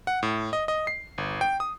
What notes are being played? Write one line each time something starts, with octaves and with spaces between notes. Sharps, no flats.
F#5
A2
D#5
D#5
C7
G1
G5
D#6